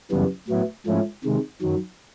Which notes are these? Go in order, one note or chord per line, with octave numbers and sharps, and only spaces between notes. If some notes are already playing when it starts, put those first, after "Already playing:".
F#2 C#3 E3 G3 B3
A2 F#3 B3 E4
G#2 F3 A3 C#4 E4
C3 D#3 G#3
F#2 D#3 F#3